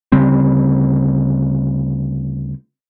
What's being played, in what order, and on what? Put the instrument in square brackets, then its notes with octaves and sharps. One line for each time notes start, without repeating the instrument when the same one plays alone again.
[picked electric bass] D2 C#3 G3 C4